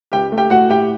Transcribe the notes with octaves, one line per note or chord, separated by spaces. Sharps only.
C#2 G4 G5
A3
G4 G5
A2 F#4 F#5
A2 G4 G5